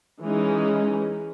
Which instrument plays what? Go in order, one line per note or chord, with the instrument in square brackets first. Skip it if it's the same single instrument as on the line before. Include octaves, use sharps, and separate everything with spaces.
[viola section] E3 G#3 C#4 D#4